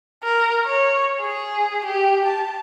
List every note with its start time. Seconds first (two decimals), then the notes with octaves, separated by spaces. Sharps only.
0.23 A#4
0.65 C#5
1.21 G#4
1.86 G4
2.26 A5